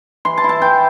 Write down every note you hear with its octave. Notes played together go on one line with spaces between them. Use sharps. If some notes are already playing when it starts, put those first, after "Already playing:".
E3 C6
A5
E4
A5
E3 G5